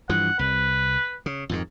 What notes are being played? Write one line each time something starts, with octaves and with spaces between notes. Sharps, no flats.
G2 E3 F3 F#5
C2 B4
C#3
F2 G#2 D#3